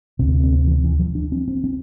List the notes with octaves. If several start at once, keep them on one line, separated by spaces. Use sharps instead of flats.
D2 C3 C4
C4
C4
C4
E3
E3
F3
D4
C4
C4
C4